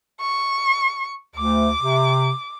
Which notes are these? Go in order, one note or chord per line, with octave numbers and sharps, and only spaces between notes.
C#6
D2 D6
C3